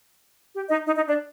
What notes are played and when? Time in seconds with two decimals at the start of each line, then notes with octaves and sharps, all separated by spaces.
0.54 G4
0.69 D#4 D#5
0.86 D#4 D#5
0.96 D#4 D#5
1.07 D4 D5